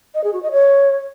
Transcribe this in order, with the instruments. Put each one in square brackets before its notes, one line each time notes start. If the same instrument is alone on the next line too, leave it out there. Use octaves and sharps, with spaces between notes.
[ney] D#5
G#4
F#4
D#5
C#5